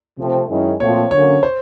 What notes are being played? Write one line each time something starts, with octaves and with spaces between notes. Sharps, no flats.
C3 F3 A3 C4
F#2 D#3 G#3 C#4 E4
A#2 F3 A3 C4 F4 C#5
D3 F#3 A#3 C#4 C#5
C5